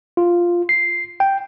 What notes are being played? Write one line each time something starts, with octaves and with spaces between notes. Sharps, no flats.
F4
C7
G5